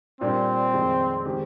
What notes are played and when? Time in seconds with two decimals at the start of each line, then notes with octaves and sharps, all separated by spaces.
0.21 A#2 G3 C4 D4
0.73 F2 D#3 G#3
1.25 D#3 G#3 C4 G4